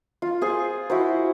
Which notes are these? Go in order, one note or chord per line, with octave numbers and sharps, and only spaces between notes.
F4
F4 G#4 C5
E4 F#4 C5